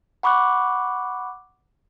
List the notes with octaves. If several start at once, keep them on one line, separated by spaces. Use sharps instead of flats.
F#5 B5 C#6 D6 F#6